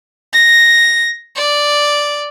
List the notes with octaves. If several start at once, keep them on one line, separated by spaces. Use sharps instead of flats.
A#6
D5